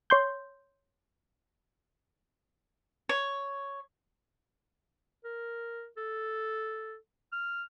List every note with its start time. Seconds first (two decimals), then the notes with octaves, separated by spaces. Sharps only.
0.10 C#5 C6 G6
3.09 C#5
5.24 A#4
5.97 A4
7.33 F6